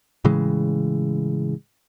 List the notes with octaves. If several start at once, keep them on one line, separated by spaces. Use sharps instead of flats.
A2 C#3 E3 G#3